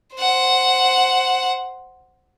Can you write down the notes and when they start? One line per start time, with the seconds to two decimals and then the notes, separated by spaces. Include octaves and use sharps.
0.15 C5 F#5